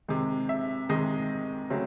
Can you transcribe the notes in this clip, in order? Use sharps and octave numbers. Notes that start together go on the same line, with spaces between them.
C3 D#3 G#3
E5
C3 D#3 G#3 D#5
C#3 F#3 A3 C4